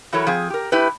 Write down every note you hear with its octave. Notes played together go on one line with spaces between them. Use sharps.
E3 F#3 E4 A4 A#4 C#5
F3 C4 G#4
G4 A#4
A3 E4 G4 B4